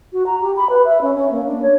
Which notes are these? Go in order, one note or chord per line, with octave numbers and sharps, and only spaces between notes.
F#4
A#5
G4
B5
B4
E5
C#4
C#4
A#3
D4
C#5